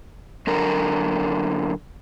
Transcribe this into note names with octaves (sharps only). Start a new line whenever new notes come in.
F#2 D3 A#4